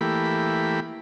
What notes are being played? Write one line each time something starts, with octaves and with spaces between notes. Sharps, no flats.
E3 A3 A#3 G4 B5